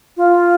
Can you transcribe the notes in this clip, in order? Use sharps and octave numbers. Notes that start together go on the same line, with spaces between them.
F4